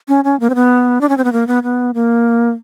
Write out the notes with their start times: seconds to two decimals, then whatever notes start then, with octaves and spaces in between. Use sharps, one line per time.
0.08 C#4
0.24 C#4
0.40 A#3
0.50 C4
0.55 B3
1.01 D4
1.09 C#4
1.17 C4
1.24 B3
1.33 A#3
1.47 B3
1.63 B3
1.94 A#3